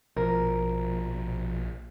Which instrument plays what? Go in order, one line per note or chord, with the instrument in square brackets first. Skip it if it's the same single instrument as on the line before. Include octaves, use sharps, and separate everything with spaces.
[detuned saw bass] A#1 [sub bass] B2 [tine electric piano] F3 [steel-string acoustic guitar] A#4